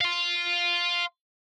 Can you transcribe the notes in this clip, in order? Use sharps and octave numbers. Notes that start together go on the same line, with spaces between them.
F5 C6